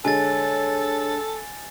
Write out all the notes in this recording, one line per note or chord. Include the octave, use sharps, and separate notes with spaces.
D3 G#3 A4 C#5 G#5 A6